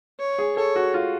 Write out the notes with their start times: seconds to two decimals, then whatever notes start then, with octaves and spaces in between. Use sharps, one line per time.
0.19 C#5
0.38 G#4
0.56 A4 C#5
0.76 F#4
0.94 F4